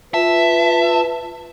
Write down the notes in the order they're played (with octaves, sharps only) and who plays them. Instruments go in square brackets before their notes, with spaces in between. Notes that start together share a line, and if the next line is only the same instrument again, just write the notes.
[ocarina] F4 [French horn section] B4 [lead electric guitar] E5 [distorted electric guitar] A5